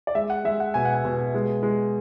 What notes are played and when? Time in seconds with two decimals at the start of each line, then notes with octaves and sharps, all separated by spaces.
0.07 D5
0.15 G#3 E5
0.30 F#5
0.45 G#3 E5
0.60 F#5
0.74 B2 G#5
0.85 F#5
0.94 G#5
1.05 B2
1.34 G#3
1.63 G#3